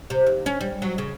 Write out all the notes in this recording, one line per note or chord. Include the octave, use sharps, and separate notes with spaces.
C3
D#2
C#4
G3
F#3
C#3